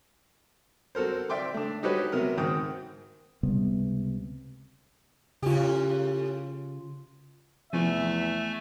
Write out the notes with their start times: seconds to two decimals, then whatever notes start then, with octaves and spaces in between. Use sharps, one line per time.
0.95 C4 F#4 A4 A#4 C5
1.29 D5 E5 G5 C6 D6
1.54 A3 D4
1.83 D#4 F#4 G4 A4 B4 C#5
2.12 C3 F#3 B3 A#4
2.37 G#2 D#3 F#4 G5 D#6
3.43 C#2 C3 G3 B3
5.43 A2 C#3 C#4 F4 G4
7.73 E2 C3 F3 A3 E5 G#5